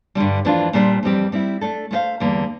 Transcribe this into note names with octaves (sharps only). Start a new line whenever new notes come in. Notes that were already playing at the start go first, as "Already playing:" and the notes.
G2 D3 G3
F2 E3 A3 D4 F4
A#2 G3 D4 A4 C5
F2 E3 G3 C4 G4
G3 C4 E4
A3 D4 A4
A3 C4 F4 C5 F5
E2 D3 G3 A#3